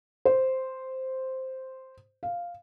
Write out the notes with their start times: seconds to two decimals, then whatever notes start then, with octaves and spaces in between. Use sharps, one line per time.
0.25 C5
2.23 F5